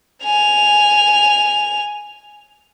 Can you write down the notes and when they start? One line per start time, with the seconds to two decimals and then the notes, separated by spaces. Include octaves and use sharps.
0.24 G#5 F7